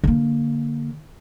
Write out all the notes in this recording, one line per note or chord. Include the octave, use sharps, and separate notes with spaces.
D3 A#3